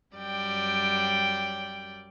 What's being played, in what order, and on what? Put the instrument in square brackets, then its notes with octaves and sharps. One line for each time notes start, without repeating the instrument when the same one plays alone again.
[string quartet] F#2 G3 D5 G5